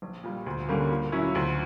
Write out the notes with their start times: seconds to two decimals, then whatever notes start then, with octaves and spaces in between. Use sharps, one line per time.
0.02 A#1
0.24 A#2 G3
0.46 D2
0.69 D3 G3 A#3 C#4
0.91 A#2
1.12 F#3 C#4 E4
1.35 D2